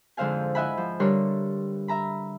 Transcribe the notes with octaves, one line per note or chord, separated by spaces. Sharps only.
F2 G#2 D3 C5 F5 G#5
E4 D#5 E5 F#5 G#5 B5
F3
D3 G3 D4 A#4 C#5 C6
E5 A#5 B5